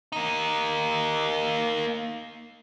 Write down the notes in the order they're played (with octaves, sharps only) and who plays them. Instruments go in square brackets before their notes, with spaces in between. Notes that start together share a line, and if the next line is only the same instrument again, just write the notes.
[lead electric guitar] A#3 D#4